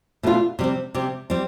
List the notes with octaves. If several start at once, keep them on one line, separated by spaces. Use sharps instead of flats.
B2 A3 D4 F4
C3 G3 C4
C3 G3 C4
G3 C4